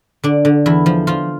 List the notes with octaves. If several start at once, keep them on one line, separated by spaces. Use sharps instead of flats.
D3 D4
D3
E2 E4
F3
F3 F4